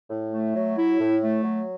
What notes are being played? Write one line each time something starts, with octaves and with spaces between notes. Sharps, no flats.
A2
A3
F#3
E4
A2
A3
F#3